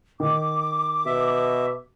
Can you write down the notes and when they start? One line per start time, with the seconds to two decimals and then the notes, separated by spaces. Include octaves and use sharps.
0.20 D#3 D6
1.06 B2 E5